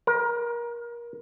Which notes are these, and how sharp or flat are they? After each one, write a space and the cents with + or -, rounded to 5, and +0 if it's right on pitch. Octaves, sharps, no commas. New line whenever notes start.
A#4 +25